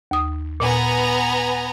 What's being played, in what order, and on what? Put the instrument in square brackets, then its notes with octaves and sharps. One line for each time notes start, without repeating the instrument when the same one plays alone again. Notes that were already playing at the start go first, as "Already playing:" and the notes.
[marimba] D#2 D#6
[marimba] A#2 [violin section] B3 G#5 A#5